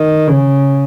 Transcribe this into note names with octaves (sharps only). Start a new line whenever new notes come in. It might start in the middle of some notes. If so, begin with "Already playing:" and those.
Already playing: D#3
C#3